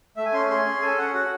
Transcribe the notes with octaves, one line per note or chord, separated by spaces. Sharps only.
A3 E5
G#5
C#4 C6
G#4 C6
C#4
A4 G#5
C#4 F#5
F#4 F#5